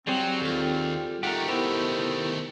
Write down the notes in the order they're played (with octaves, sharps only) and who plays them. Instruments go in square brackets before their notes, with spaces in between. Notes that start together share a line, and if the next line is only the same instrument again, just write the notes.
[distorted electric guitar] F#3 [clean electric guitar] G3 G#4 C5 [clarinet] C4
[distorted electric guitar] D#2 [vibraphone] F4 A4
[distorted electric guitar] D#3 A3 [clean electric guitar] G4 A#4 [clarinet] F#5
[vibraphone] B3 E4 A#4 [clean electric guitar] G4 [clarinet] C5